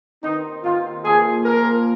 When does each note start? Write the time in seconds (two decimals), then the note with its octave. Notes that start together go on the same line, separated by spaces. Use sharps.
0.23 C3 D#3 C4 D#4
0.64 C3 D#3 C4 F4
1.05 A#2 F3 A#3 G#4
1.45 A#2 F3 A#3 A#4